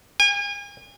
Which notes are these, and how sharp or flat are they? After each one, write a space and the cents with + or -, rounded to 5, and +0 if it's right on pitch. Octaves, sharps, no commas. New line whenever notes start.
G#5 -40